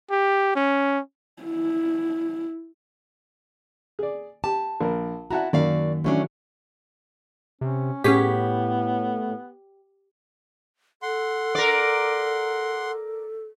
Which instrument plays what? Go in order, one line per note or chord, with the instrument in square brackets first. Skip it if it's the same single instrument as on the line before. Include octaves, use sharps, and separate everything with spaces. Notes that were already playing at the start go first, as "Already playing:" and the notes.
[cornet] G4
C#4
[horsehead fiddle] E4
[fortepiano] G#4 D5
[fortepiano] G4 [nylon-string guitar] A5
[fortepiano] A#1 A#4
[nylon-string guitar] E4 F#4 [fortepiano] F#5 A5 A#5
[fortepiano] F#2 A#3 [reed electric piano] D#3 [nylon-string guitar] F#4 D5 F5
[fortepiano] A1 F#3 [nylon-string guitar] A3 C#4 D4
[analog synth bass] C3 [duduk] C#4
[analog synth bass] A2 [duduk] B3 [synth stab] C#4 G#4 B6 [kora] G4 C#5
[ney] A4 [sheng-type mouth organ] F#5 C6
[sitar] A#4 D5